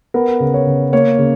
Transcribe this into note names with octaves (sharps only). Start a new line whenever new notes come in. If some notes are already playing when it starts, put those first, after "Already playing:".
B3 A#4
C#3
C#5
C#3
A#3 C#5
C#3